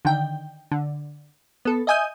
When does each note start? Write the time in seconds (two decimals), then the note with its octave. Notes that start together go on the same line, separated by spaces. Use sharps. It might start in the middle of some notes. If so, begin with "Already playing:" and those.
0.05 D3 D#3 G5
0.72 D3
1.65 B3 A4
1.87 D#5 E5 G#5 D#6 G6 D#7